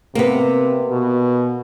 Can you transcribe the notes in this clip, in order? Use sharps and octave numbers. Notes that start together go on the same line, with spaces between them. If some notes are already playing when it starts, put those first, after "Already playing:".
C3 A#3 B3
B2